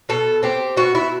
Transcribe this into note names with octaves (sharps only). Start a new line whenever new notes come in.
B2 A4
C4 G4
B2 F#4
E4